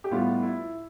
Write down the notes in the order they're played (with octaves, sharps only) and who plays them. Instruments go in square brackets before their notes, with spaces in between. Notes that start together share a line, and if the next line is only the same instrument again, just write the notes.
[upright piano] G4
A2 G3 B3 F4
E4